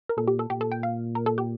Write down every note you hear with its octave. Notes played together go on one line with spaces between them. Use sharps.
A#4
A#2 A4
G4
A4
A#2 G4
A4
G5
F5
A#4
A4
G4